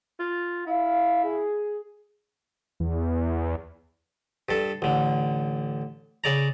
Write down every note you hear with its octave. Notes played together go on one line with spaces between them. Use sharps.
F4
E4 F5
G#4
E2
G2 A4
A1 D3
C#3 D5 A#5